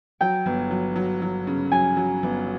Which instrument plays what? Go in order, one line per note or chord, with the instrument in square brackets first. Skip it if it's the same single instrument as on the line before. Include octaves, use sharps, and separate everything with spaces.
[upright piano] F#3 [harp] G5
[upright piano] G1
F#3
F#3
F#3
C#3
[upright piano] F#3 [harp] G#5
[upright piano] F#3
G1